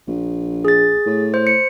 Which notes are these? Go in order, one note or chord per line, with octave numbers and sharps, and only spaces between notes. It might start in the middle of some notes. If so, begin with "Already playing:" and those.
A#1
G#4 A6
A2
C5
C#7